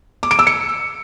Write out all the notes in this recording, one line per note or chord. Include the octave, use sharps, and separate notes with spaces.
D6
D7
E6
C#7